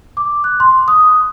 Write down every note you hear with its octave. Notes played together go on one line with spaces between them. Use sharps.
D6
F#6
C6
D#6